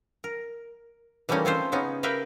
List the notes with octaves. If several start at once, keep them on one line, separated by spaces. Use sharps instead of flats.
A#4
E3 G3 A3 A#3 C#4 D#4
C4 C#4 F4 A4 C5
C#3 B3 C#4 D#4
G4 A#4 B4 E5 F5 G5